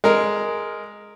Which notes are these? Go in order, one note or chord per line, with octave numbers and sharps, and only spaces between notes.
G#3 A#4